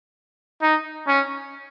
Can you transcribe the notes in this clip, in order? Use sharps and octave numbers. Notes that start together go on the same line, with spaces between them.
D#4
C#4